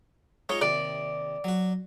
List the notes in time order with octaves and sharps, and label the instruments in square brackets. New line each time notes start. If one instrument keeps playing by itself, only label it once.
[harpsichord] G#3 D#4 F4 [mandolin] C#5
[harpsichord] D#2 C3 [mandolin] D5
[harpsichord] F#3 F#4